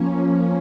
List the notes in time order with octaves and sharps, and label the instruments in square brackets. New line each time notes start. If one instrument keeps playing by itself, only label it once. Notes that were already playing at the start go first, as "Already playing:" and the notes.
Already playing: [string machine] F3 A#3 C#4